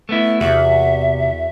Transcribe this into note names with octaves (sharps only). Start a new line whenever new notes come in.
A3 B3 E4
E2 C3 F#4 E5